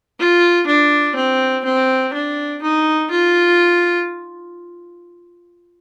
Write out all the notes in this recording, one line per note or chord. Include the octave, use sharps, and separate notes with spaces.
F4
D4
C4
C4
D4
D#4
F4